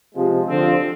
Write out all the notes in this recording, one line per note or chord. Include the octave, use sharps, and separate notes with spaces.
C3 F3 G#3
D3 F3 C4